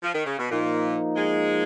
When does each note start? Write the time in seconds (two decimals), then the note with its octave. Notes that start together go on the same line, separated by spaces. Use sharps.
0.03 F3
0.14 D#3
0.26 C#3
0.38 B2
0.50 A#2 F3 A#3 D#4
1.16 G#3